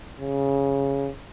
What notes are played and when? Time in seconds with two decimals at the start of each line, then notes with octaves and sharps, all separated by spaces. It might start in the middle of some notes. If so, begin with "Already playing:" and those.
0.20 C#3